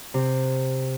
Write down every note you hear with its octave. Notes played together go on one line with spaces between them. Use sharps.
C3